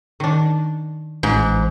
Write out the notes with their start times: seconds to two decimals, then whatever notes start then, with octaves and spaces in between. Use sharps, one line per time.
0.20 D#3 D4
1.23 A1 G#2